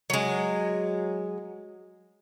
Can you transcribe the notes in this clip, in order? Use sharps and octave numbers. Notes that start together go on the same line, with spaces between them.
F#3 G#3